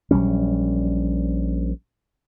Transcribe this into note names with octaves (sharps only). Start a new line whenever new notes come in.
A#1 F#3 G3 C#4